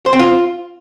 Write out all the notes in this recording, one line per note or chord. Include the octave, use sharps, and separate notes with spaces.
C5
C4
F4